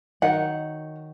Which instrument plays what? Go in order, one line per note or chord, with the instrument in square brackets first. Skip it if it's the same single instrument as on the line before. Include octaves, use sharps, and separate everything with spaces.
[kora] D#3 F#3 [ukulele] F#5